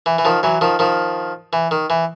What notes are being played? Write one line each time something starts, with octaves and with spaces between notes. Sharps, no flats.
E3
E3
D#3 F3
E3 F#3
D#3 F3
D#3 F3
E3
D#3
E3